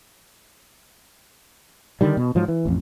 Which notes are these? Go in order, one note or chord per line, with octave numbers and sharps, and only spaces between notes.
D3 D#3 G3
B2
G#2 F3 F#3
E3
A1 F2